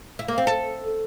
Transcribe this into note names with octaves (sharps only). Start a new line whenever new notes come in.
E4
A#3
C4
A4